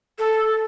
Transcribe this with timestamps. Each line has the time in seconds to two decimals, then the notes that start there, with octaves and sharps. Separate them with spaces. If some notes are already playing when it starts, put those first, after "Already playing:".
0.18 A4